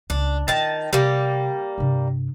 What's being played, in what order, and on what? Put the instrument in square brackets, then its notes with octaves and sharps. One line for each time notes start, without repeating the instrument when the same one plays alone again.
[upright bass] C#2 [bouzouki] D4
[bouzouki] D#3 A5 [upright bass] F4
[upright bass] C3 [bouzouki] G3 A#3
[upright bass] G2 C3